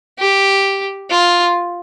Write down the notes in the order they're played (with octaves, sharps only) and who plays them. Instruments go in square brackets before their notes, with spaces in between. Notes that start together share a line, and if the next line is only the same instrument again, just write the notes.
[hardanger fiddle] G4
F4